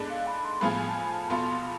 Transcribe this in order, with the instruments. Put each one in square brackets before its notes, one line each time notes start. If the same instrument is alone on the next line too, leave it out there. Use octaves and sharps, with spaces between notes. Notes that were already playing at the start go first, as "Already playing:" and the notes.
Already playing: [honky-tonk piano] G#2 G#3 B3 D4 A4
[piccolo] F5
B5
C6
[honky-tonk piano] A2 F3 B3 F4 G#4 [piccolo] B5
[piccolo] G#5
A5
G#5
A5
[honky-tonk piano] E2 B2 B3 F4 A4 [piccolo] C6